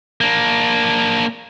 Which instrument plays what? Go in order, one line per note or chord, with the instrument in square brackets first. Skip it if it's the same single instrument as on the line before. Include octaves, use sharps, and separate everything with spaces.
[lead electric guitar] A#3 D4